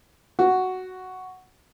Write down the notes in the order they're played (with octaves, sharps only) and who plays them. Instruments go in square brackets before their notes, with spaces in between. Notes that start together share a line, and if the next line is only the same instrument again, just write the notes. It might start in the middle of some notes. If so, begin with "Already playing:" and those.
[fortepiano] F#4